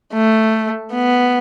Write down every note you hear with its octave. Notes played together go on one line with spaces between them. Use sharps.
A3
B3